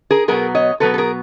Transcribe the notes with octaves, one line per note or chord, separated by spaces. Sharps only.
G#4 A#4
B2 F#3 B3 G#4 A#4
C#5 D#5
B2 F#3 B3 A4 B4
A4
G#4 A#4